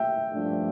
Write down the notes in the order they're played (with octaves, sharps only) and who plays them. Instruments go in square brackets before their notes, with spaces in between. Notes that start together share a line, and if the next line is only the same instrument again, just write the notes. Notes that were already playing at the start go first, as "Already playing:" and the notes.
Already playing: [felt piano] E5 G5
[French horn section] G2 F3 A3 D4